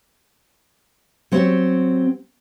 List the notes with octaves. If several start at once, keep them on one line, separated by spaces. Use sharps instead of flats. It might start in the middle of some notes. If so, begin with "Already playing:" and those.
F#3 C4 G4 C#5